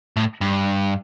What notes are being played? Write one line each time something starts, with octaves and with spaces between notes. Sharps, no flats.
A2
G2